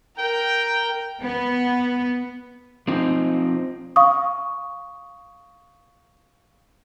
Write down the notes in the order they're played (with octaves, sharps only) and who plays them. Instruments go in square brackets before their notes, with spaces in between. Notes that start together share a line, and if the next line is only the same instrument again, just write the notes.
[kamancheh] A#4 [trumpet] G5
[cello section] B3
[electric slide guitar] F3 C4 D#4
[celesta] F5 C#6 D#6